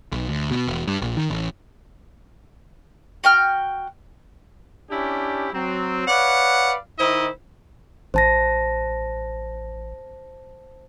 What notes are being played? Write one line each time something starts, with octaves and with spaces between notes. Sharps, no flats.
B1
D2
B2
E1
G2
A#1
D#3
A1
F#4 G5 F6
C#4 D4 E4 G4
F#3 C4
B4 C#5 D5 F5 F#5
D#3 D#4 E4 C5 D#5
A1 C5 A5 A#6